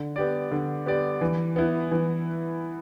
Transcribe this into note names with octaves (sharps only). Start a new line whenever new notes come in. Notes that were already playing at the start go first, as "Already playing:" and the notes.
Already playing: D3
B3 G4 D5
D3
B3 G4 D5
E3
B3 E4
E3